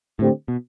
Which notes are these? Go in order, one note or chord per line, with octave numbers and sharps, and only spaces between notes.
A2 D3 A3 C4 G4
B2